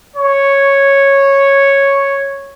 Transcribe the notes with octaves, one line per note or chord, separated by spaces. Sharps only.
C#5